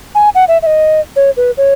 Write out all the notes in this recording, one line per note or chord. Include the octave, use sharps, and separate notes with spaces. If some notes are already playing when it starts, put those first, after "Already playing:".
G#5
F#5
E5
E5
D#5
C#5
B4
C#5